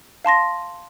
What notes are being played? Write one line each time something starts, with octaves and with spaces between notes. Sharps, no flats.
F5 A5 C6 A#6